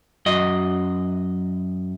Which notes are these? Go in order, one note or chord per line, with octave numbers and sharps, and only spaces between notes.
F#2 F#4 D#5